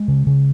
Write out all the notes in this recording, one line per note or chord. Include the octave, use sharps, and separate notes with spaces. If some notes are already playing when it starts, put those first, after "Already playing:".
Already playing: G#3
C#3
C#3